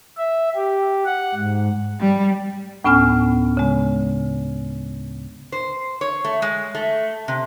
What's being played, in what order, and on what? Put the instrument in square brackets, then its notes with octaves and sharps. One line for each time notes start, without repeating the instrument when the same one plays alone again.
[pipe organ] E5
G4
F#5
G#2
[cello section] G3
[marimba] D2 A2 B3 C#4 G#5 F6
C#3 G#3
[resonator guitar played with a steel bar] C5
C#5
A3
G#3
A3
C3